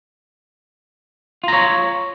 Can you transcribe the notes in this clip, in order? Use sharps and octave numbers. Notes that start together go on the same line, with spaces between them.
F4 C#5 A#5